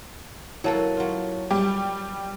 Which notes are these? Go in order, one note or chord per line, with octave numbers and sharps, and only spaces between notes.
F#3 A#3 E4 A4 C#5 A5
F#3 F4
G3 G4 D6